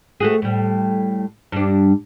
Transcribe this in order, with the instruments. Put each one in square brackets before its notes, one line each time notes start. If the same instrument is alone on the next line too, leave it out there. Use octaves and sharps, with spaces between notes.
[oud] A3 F#4 G#4
A2 G3
G2 D4